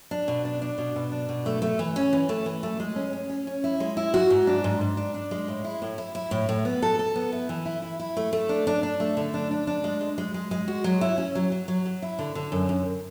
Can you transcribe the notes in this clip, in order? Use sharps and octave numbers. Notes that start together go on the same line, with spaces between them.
D4
B2
D4
D4
B2
B2
D4
B2
A3
A3
E3
C#4
E3
A3
E3
A3
G#3
C#4
C#4
C#4
C#4
E4
G#3
E4
F#4
G#2
D4
G#2
G#2
D4
D4
G#3
A2
E4
A2
E4
E4
A2
A2
B3
A4
A4
B3
E4
E3
E4
E4
E4
A3
A3
D4
D4
D4
A3
D3
D4
D4
D4
G#3
G#3
G#3
G#3
G#3
F#4
F#3
E4
C#4
F#3
F#3
F#3
F#3
E4
D3
D3
F#2
F#2